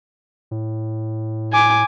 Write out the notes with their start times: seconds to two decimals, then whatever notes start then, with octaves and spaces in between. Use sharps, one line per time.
0.51 A2
1.53 G#5 D6